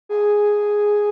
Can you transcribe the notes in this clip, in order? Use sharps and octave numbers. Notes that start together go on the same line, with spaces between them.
G#4